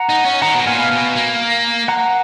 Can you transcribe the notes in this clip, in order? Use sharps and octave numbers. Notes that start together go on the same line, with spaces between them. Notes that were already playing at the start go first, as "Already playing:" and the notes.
Already playing: F#5 A#5
D#4
C#4
D#3 F#5 A#5
B2
A#2 F5 G#5
B2
B2
A#3
F#5 A#5